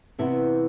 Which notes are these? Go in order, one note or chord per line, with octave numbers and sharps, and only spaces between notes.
C3 E3 B3 E4